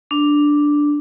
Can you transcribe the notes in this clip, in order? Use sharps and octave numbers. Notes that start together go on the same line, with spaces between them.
D4